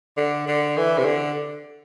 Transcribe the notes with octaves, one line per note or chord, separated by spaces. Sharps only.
D3
D3
E3
C3
D3